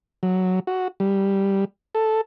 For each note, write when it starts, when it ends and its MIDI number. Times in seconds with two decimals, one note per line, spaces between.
0.23 0.60 54
0.67 0.88 66
1.00 1.65 55
1.95 2.21 69